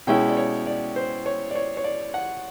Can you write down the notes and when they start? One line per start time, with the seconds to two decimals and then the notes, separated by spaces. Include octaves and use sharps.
0.07 B2 G#3 C#4 E4 G5
0.29 D5
0.37 C#5
0.67 D5
0.96 C5
1.26 C#5
1.51 D5
1.55 C#5
1.77 C#5
1.84 D5
2.14 F#5